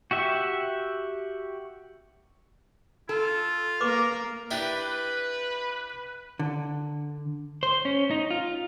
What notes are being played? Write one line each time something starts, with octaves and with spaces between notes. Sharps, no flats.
F#4 G4 E5
F4 A4
A#3 A#4 B4 C#6 D6
D4 E4 G4 B4
D3
C5
C#4
D#4
F4